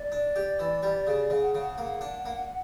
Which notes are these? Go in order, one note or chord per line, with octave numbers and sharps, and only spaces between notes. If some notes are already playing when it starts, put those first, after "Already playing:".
Already playing: D5
D4
G4
E3
G3
C#3
C#3 F#5
C#3
A#3 F#5
D4
A#3